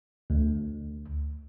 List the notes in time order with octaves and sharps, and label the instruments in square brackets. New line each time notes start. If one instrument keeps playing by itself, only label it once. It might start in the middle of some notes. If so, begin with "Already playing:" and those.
[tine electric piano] D2